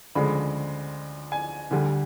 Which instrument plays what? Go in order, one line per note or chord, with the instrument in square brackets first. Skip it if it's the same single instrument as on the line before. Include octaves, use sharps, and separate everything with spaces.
[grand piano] D2 C#3 F3 G#3 B5
G#5
D2 D3 G3